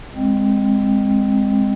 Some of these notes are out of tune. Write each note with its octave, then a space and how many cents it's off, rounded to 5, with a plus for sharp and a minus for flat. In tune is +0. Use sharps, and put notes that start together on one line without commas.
G#3 -15 C4 +0